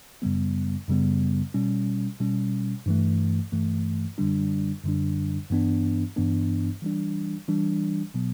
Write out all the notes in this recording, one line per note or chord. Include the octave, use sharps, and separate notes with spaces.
F#2 C#3 G3 B3
F#2 C#3 G3 B3
B2 G3 C#4
B2 G3 C#4
G2 E3 A3
G2 E3 A3
F#2 D3 G3 D4
F#2 D3 G3 D4
G2 E3 B3 D4
G2 E3 B3 D4
E3 G3 D4
E3 G3 D4
B2 F#3 B3